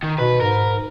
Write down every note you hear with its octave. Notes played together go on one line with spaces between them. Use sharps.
D#3
B2 B4
G#2 A#4